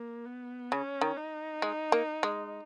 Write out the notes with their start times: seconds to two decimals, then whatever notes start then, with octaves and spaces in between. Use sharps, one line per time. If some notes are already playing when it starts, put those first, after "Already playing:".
Already playing: A#3
0.25 B3
0.72 C#3 C#4
1.01 D#3
1.17 D#4
1.62 G#3
1.92 A#3
2.23 G#3